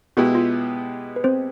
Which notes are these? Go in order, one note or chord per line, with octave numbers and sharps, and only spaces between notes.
B2 G#3 B3 E4 F#4 G4
F4
B4
C4 C5